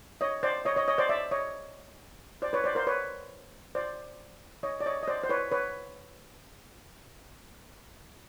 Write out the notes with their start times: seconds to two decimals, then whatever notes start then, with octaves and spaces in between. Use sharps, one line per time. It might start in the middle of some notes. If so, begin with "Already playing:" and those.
0.21 C#5 D#5
0.43 C5 D5
0.65 C#5 D#5
0.76 C#5 D#5
0.88 C#5 D#5
0.98 C5 D5
1.09 D5 E5
1.31 C#5 D#5
2.42 C5 D5
2.53 B4 C#5
2.64 C5 D5
2.75 A#4 C5
2.87 B4 C#5
3.75 C5 D5
4.63 C#5 D#5
4.81 D5
4.86 C#5 D#5
5.03 D#5
5.08 C5 D5
5.24 C5
5.29 B4 C#5
5.52 B4 C#5